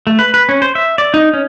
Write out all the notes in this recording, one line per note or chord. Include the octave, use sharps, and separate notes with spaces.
A3
B4
B4
C#4
C5
E5
D5
D#4
C#4